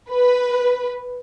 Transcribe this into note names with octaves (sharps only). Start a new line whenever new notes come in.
B4